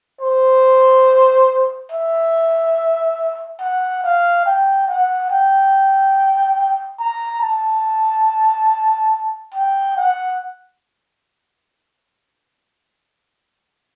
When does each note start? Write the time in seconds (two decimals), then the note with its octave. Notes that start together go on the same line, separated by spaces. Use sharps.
0.21 C5
1.92 E5
3.60 F#5
4.04 F5
4.45 G5
4.88 F#5
5.31 G5
7.00 A#5
7.42 A5
9.54 G5
9.96 F#5